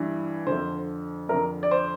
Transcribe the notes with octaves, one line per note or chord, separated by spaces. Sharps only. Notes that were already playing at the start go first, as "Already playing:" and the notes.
Already playing: G2 E3
F2 D3 C5
F2 D3 A#4
D5
C5